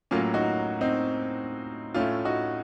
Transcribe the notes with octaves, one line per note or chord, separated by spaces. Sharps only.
A2 F#3 A#3 C#4 F4
D#4 F#4
C4 D#4
A2 A3 C#4 F4
D#4 F#4